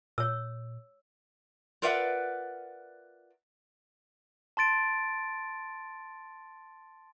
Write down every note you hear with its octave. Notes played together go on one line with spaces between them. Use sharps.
A#2 C#5 E6
F4 A#4 B4 D5 E5 F#5
A5 C6 A6 D7